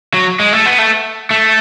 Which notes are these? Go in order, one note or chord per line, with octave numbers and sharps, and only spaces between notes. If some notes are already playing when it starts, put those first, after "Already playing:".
F#3
G#3
A3
B3
A3
A3